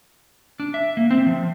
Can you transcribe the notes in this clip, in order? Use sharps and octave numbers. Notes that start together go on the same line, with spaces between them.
D4
E5
A#3
C4
F3